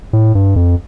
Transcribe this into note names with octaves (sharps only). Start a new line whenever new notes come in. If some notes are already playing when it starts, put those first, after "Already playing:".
A2
G2
F2